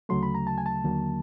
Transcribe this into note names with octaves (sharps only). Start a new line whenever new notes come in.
D2 C#3 F#3 A3 C6
B5
A#5
A5
G#5
A5
D#2 D3 F#3 A#3